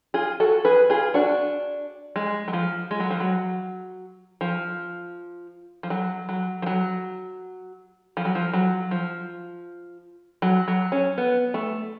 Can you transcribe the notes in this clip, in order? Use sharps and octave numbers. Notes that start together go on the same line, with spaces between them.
F4 G#4
F#4 A4
G#4 B4
F4 G#4
D4 F#4
G#3
F#3
F3
G#3
F#3
F3
F#3
F3
F3
F#3
F#3
F3
F#3
F3
F#3
F3
F#3
F3
F#3
F#3
C#4
B3
A3